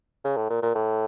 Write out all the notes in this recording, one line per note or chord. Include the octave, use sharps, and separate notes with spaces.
C#3
A2
A#2
A#2
A2